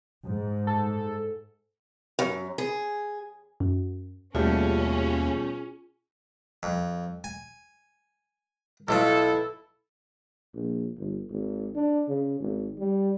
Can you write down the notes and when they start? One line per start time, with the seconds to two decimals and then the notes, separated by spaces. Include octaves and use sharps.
0.25 G#2
0.67 A4
2.19 F#2
2.58 G#4
3.60 F#2
4.35 D#2 B2 G3 A3 C#4 F4 G#4
6.63 F2
7.24 G#5
8.88 B1 B2 E4 F4 A4
10.54 A#1
10.98 G1
11.30 G#1
11.76 D4
12.09 C#3
12.40 G#1
12.79 G3